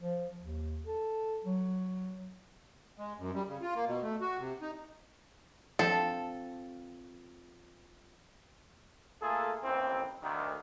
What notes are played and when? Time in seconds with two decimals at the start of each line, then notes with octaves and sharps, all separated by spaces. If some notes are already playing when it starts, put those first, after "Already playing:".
0.01 F3
0.40 D#2
0.86 A4
1.45 F#3
2.97 G#3
3.18 F#2
3.34 G3
3.47 C#3
3.61 F4
3.75 A#3
3.87 B2
4.02 A3
4.21 F#4
4.39 C3
4.61 D#4
5.79 F3 C4 A4
9.21 A3 A#3 F4 G#4 A4
9.63 A1 D#2 E3 C4
10.23 D2 D#3